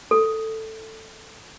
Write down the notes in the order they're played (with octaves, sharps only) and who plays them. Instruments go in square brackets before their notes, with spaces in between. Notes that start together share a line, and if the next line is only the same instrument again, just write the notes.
[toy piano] A4